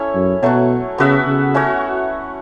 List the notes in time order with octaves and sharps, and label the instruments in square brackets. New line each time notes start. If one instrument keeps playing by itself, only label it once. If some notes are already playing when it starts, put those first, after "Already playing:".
Already playing: [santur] C#4 E4 A4 C#5
[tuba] F#2
[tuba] B2 [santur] F#3 A3 F#4
[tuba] C#3 [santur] B3 F#4 B4 E5
[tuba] C#3
[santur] A3 C#4 F#4 C#5